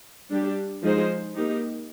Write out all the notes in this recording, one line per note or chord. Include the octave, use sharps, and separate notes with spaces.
G3 D4 G4
F3 G#3 D#4 G#4 C5
A#3 D#4 G4